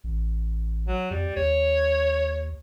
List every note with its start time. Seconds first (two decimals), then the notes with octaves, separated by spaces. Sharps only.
0.04 A1
0.88 F#3
1.11 F2 G3
1.36 D#2 C#5